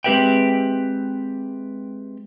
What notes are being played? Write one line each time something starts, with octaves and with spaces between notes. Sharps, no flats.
G#3 C4 G4 B4 E5 G5